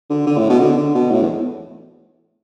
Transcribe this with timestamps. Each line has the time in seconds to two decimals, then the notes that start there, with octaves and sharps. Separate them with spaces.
0.10 D3
0.27 D3
0.38 A2
0.49 B2
0.60 D3
0.77 D3
0.94 B2
1.11 A2
1.22 E2